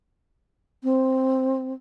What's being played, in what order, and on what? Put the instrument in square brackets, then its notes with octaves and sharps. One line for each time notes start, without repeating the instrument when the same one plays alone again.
[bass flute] C4